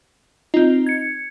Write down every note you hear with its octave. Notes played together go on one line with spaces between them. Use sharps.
C4 D#4 F4
G#6 C#7